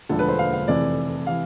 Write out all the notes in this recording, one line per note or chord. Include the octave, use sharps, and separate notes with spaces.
E1 D2 D3 F3 A4
B4
C5
F5
F5
F1 F2 C3 E3 D5
C3 E3 F5